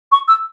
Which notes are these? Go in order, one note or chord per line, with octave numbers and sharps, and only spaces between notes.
C#6
E6